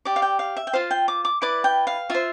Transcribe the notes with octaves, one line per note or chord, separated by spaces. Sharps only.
G4 D5
F5
G5
F5
E5
G5
F4 C5 F5
G5
D6
D6
E4 B4 D5 D6
G5
F5
F4 C5 E5